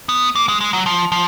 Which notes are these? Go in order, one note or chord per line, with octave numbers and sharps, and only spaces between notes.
B3
A#3
G#3
G#3
F#3
F3
F3